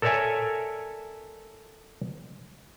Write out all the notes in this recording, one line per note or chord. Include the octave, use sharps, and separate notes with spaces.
A4 A#4 C#5 D5 E5 G#5